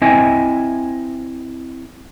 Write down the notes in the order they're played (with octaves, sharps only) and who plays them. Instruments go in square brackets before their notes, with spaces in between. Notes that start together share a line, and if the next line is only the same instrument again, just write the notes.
[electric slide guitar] C4 E4 D#5 E5 G#5